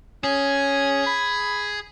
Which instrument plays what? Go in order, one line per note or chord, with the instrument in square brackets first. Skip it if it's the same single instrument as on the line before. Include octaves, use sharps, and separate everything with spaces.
[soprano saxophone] C#4 [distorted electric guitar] G#4
[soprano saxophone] B5